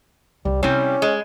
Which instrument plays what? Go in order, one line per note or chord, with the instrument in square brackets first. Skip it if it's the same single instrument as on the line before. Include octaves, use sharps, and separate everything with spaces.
[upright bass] C2 [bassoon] G3
[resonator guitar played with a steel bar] C3 G3 [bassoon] C#4 [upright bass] E4
[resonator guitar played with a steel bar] G#3